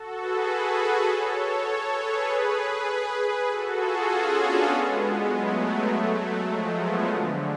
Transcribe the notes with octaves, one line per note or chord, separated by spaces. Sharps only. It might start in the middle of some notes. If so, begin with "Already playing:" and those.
Already playing: F#4 A4
G#4 B4
A4 C#5
A4 C#5
G#4 B4
F#4 A4
F4 G#4
C#4 F4
B3 D4
G#3 B3
F#3 A3
F3 G#3
G#3 B3
D3